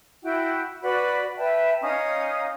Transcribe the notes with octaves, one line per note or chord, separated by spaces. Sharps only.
E4 F#4 G5
F#4 B4 D5 B5
B4 E5 G5 A5
C#4 D#4 F5 D#6